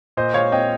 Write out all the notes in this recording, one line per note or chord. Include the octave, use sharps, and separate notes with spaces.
A#2 C5 D#5
G#3 C#5 F5
C4 D#5 G5